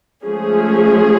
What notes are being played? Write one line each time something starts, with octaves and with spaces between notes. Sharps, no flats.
F3 G#3 A3 C#4 G#4